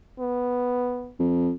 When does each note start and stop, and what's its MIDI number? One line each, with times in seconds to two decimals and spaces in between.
0.20 1.12 59
1.19 1.51 41